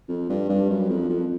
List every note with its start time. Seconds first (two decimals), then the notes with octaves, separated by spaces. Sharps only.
0.09 F2
0.30 G2
0.49 G2
0.70 F#2
0.89 F2
1.09 F2